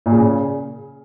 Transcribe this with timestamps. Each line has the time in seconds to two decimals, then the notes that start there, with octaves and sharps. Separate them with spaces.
0.06 A#2
0.12 C#3